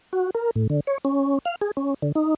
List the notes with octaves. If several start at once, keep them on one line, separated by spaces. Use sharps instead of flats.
F#4
A#4
A2
D3
C#5
C#4
F5
G#4
C#4
D3
D#4